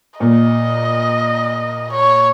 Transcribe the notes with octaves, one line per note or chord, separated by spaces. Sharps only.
A#2 D#5
C#5